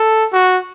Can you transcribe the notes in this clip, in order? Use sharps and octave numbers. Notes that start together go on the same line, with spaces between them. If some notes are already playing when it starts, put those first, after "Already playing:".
Already playing: A4
F#4